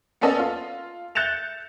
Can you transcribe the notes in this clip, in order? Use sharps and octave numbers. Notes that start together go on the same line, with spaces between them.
A#3 B3 C#4 A4 D5 D#5
F4
F#6 G6 A6 C#7 E7 F7